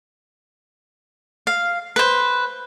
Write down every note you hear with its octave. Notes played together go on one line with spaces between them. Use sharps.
F5
B4 C5